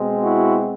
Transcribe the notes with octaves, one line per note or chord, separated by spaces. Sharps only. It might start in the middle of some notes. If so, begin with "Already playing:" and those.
Already playing: B2 G#3 C4
E4 F#4